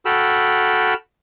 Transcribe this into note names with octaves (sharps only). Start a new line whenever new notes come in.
F#4 A4 G5 B5 E6 F6